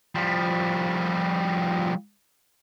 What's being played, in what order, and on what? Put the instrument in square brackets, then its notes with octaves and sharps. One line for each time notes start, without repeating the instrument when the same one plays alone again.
[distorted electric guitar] F3 G3